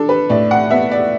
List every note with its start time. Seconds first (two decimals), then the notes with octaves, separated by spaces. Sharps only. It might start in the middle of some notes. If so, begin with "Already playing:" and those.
Already playing: D4 A4
0.09 B4
0.30 A2 D5
0.51 F#5
0.71 B3 E5
0.91 D5